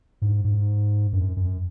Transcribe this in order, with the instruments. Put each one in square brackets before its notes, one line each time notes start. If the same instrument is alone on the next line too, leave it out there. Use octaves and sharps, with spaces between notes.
[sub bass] G#2
G#2
F#2
F#2